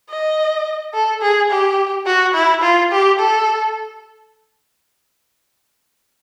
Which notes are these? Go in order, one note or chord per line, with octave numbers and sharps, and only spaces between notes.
D#5
A4
G#4
G4
F#4
E4
F4
G4
A4